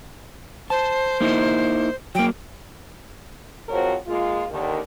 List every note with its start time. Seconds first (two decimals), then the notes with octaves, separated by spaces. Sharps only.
0.70 C5 A5
1.21 A#3 D#4 E4
2.15 F#3 A#3 G5
3.69 F3 G#3 C4 F#4 A#4 C#5
4.07 G#3 A#3 F4
4.49 D#2 D3 D#3